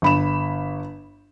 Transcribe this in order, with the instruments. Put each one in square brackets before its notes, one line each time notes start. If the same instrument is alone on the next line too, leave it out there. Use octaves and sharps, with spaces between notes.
[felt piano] G1 B5 E7